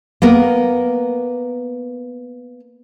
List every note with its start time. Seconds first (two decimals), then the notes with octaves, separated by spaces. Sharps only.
0.22 A#3 B3 A#4